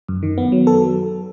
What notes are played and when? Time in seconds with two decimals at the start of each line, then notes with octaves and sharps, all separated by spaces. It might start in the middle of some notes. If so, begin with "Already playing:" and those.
0.08 F#2
0.23 D#3
0.38 B3
0.52 F#3
0.67 A4